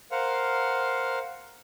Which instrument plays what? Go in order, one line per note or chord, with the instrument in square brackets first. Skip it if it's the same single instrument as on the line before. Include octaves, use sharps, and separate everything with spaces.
[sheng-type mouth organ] A#4 C5 F5 F#5